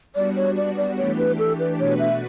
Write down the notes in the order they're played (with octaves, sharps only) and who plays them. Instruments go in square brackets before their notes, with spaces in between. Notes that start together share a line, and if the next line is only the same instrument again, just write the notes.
[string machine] G3 B3 D4 F#4 [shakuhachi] D5
[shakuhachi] C#5
D5
D5
[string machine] E3 A3 D4 G4 [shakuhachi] C#5
[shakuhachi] B4
A4
B4
[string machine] B2 A3 D4 F#4 B4 [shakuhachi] C#5
[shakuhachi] E5